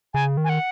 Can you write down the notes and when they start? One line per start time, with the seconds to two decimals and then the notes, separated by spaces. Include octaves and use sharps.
0.14 C#3 G#5
0.37 D#3
0.44 G#5
0.49 F#5